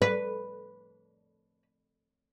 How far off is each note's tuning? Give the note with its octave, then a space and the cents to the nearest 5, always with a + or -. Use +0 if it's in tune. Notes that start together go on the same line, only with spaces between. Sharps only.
B4 +0